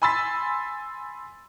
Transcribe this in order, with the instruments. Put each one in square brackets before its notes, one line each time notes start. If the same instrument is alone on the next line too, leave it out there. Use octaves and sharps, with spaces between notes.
[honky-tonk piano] G#5 B5 C6 E6 A6 B6